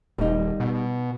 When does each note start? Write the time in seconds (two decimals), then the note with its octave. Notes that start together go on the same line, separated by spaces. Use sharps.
0.18 D#1 G3 D#4
0.60 B2